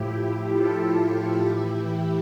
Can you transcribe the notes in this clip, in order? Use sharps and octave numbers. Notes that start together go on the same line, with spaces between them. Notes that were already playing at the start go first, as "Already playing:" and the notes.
Already playing: A2 F3 E4 G4
F4 A4
A2 E3 E4 G4